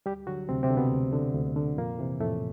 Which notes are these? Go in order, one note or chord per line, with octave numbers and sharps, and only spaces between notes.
D2 G3 G4
D3 F#3 F#4
D2 C3 C4
C3 C4
D3
B2 B3
D2
D3
D2
D3
F2 A#2 A#3
C3 E3
F2 A2 A3